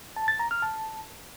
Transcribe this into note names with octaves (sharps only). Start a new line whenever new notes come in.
A5
A6
A#5
F6
A5